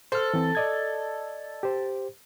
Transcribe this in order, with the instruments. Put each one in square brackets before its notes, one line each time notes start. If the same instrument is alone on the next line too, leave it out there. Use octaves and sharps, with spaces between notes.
[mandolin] A4 [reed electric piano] C5 F6
[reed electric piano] E3 C4
D5 D#5 G#6
G4 C5